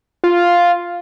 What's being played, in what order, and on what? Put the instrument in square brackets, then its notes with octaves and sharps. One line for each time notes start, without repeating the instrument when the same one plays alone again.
[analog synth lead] F4